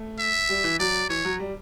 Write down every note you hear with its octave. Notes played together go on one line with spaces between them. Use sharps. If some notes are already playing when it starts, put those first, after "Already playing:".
Already playing: A3
E5
G3
E3
F#3 D5
E3 C#5
F#3
G3